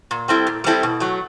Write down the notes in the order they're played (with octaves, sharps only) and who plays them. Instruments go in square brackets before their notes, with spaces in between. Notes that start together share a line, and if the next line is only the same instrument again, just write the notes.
[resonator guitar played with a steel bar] A#2
G3 C4 E4 A4
A#2
G3 C4 E4 A4
B2
F#3 A3